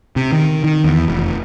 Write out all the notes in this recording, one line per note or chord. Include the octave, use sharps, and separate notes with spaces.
C3
D#3
D#3
E2
F1